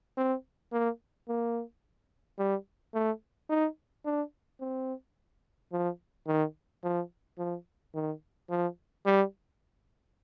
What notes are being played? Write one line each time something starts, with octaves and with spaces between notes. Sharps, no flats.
C4
A#3
A#3
G3
A3
D#4
D4
C4
F3
D#3
F3
F3
D#3
F3
G3